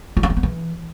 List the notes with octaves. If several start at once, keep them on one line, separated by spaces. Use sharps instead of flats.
F4
C#4
C4
B3
E3